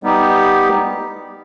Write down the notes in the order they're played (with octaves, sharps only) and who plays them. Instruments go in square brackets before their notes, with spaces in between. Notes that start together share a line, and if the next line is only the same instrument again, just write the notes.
[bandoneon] G3 B3 D#4 G4